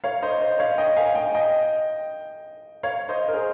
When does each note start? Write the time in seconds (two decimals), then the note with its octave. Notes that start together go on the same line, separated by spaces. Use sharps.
0.04 C#5 F5
0.22 C5 D#5
0.41 C5 D#5
0.59 C#5 F5
0.78 D#5 G5
0.97 F5 G#5
1.15 D#5 G5
1.34 D#5 G5
2.83 C#5 F5
3.09 C5 D#5
3.28 A#4
3.33 G#4 C5